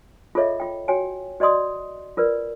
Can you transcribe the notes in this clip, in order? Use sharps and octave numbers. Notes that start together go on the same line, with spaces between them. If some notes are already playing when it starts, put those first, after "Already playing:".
F4 G#4 A4 C#5 D#5 E5
F4 G5
F#4 C#5 G5 G#5
F#4 D5 D#5 C6 D#6
F4 A#4 B4 D5